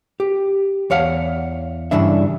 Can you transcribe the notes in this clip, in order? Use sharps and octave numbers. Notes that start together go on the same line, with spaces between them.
G4
E2 C#5 F5 F#5
G2 C#3 E3 D4 E5